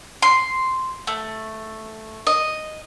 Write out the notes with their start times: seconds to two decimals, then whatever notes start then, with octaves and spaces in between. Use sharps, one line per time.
0.22 C6
1.07 A3
2.27 D#5